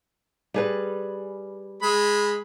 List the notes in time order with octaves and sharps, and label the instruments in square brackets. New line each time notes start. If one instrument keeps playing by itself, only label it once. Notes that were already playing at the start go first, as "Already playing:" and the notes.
[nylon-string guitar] G3 G#4 B4
[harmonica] G#3 B5